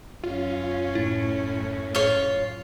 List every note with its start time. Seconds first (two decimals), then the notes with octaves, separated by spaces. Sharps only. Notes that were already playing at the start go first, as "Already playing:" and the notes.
0.23 F#2 C#4 F4
0.95 A2 E4
1.95 F4 C#5